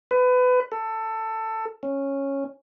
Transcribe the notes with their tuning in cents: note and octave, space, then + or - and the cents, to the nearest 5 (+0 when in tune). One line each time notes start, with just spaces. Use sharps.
B4 +25
A4 +15
C#4 -10